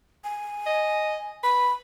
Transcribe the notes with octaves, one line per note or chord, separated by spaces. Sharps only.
G#5
D#5
B4 B5